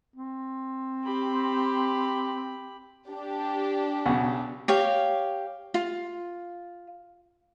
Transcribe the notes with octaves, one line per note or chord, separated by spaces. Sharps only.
C4
G4 B5
D4 G4
B1 C#3 F#5
G4 C#5 F5
F4